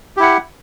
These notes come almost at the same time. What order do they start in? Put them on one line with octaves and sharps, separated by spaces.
G4 E4 F#5